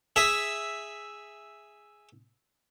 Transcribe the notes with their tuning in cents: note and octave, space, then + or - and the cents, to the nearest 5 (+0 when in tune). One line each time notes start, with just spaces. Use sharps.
G#4 +0 E5 +0